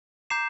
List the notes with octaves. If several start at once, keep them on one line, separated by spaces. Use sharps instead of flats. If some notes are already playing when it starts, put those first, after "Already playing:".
A#5 D6 G6 C7 E7